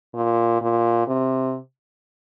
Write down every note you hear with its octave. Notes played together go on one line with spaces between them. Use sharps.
A#2
A#2
C3